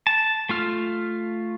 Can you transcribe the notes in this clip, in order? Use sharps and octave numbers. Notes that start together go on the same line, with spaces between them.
A5
A3 F4 F6